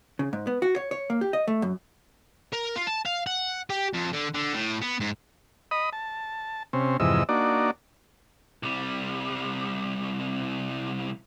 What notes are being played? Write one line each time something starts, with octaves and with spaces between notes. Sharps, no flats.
C#3
G#2
B3
F#4
C#5
C#5
A#3
G4
D#5
A3
F#2
A#4
F4
A5
F5
F#5
G4
F2
D3
D3
A2
B3
G#2
D#5 B5 D#6
A5
C3 C4 C#4
F2 G#2 C3 E3 D#5 E6
A#3 D4 D#4 F#4 D5
C2 G3